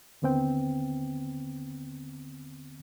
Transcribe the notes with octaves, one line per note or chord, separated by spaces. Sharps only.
D#2 D3 B3 C4 G5